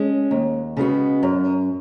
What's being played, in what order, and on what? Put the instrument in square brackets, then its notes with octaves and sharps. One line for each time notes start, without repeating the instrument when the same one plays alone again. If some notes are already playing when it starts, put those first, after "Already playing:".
Already playing: [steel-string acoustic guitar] G#3 C#4
D#2
C#3 G#3 B3 F#4
F#2